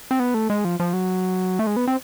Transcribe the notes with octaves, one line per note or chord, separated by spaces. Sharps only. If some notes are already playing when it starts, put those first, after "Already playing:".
C4
B3
A3
G#3
F3
F3
F#3
A3
G#3
B3
C4